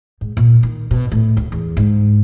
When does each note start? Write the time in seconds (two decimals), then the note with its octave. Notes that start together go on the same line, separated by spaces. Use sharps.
0.21 G#2
0.37 A#2
0.63 D#3
0.91 B2
1.12 A2
1.37 D2
1.52 E2
1.77 G#2